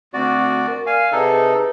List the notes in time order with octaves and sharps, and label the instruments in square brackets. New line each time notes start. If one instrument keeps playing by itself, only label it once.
[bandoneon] D2 F#4 D5 [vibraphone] C4
[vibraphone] A#4
[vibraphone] D5 [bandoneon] F5 G#5
[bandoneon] C3 D#4 A4 [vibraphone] G#4 B4 F#5